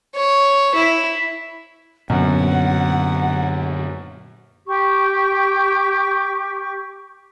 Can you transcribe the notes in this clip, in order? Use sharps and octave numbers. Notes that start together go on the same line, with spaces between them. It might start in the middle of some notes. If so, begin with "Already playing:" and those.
C#5
E4
F#2 A#2 D3 B3 F#5
G4 C#6